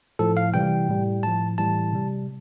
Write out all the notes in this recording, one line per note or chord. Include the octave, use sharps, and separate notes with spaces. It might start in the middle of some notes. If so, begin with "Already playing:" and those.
A2 F3 A4
F5
C3 E3 G3 G5
A2 G3
A2 F3 A5
A2 E3 G3 A5
C3 G3